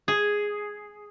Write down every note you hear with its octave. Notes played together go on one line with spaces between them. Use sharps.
G#4